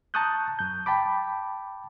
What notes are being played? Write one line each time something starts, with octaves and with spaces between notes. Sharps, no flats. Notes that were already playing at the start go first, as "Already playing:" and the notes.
A5 A#5 C#6 D#6 F#6 G6
F#2 G6
G5 A5 B5 D6